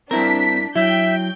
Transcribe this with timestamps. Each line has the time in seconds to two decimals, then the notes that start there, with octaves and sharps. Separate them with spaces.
0.11 G2 C4 D4 E4 A#4 B6
0.76 F#3 E4 E5 G5 G6